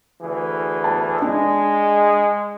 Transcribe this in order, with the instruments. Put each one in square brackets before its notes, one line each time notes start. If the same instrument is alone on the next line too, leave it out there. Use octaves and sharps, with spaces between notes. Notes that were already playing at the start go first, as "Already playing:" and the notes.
[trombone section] D2 E3 G#4
[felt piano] A5
[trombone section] G#3 [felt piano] D4